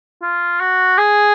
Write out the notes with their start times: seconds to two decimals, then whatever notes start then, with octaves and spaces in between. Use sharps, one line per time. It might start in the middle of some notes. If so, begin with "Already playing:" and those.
0.22 F4
0.60 F#4
0.98 G#4